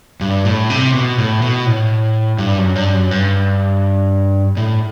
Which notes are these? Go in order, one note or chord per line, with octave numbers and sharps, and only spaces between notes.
G2
A2
C3
B2
A2
B2
A2
G2
F#2
G2
F#2
G2
A2